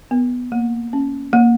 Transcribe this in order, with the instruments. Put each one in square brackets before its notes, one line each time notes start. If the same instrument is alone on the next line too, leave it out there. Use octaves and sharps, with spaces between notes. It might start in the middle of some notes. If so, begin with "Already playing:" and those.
[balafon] B3
A#3
C#4
A#3